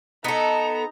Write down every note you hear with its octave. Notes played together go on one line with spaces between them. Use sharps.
B3 D#4 A4 A#5